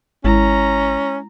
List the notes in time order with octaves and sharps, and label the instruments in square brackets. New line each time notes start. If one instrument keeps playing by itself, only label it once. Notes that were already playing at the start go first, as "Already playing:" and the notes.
[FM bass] G#1 [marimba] G#3 E4 [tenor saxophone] C#4 [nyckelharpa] A#5